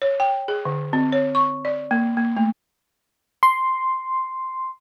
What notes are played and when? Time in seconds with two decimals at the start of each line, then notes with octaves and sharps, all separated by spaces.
0.02 C#5
0.20 G5
0.48 G#4
0.65 D3
0.93 C4
1.12 C#5
1.35 C#6
1.65 D5
1.91 A#3
2.17 A#3
2.37 A3
3.43 C6